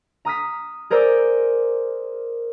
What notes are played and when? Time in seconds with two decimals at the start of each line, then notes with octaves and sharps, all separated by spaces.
0.25 A#5 D#6 F6 B6
0.90 G#4 A#4 C5 D5 D6 E6